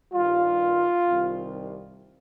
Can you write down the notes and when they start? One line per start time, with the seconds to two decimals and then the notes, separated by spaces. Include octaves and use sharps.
0.13 G2 D#3 G3 F4
1.08 C2 C3 D#3 G3